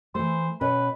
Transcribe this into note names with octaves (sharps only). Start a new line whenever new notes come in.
E3 A3 C5
B2 C#4 B4